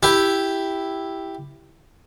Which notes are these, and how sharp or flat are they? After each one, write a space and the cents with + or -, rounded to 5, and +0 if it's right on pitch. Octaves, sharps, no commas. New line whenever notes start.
E4 +0 G4 +0